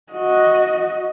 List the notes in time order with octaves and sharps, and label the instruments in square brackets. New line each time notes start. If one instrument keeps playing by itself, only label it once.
[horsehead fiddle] F#4 D#5